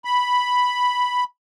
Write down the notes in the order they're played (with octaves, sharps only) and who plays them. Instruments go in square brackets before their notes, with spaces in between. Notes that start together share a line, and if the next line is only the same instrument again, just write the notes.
[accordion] B5